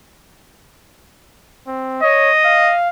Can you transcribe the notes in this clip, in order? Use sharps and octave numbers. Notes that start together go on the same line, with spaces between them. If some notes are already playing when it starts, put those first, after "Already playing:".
C4
C#5 D#5
F5